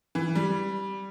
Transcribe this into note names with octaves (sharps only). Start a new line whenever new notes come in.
E3
G3